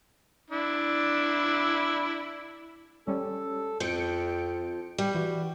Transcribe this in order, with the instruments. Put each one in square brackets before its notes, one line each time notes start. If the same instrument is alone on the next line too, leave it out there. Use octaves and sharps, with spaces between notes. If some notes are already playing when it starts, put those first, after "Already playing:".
[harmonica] D4 E4
[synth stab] G3 C#4 [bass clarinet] A4
[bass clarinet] F2 [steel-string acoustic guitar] F3 [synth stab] G6 C#7 D7
[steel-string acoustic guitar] G3 [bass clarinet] G4
[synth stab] E3 [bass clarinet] F#4